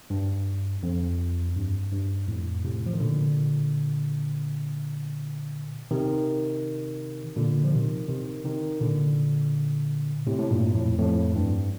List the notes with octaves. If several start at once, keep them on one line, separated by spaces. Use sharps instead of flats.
G2
F2
G2
G2
F2 A2
A2 C3
F3
D#3
A#2 D3
C3 D#3
A#2 D3
F3
C3 D#3
C3 D#3
C3 D#3
A#2 D3
A2 C3
A2
G2 A#2
F2 A2
F2 A2
G2